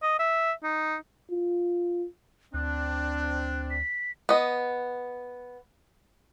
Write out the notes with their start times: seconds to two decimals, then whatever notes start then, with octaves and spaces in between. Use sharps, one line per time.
0.03 D#5
0.19 E5
0.63 D#4
1.32 F4
2.54 D2 C4 D4 F#6
3.70 B6
4.29 B3 D#5